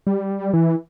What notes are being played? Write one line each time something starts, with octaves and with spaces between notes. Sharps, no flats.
G3
E3